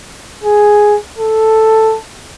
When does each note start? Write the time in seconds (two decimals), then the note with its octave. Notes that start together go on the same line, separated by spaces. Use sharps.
0.44 G#4
1.18 A4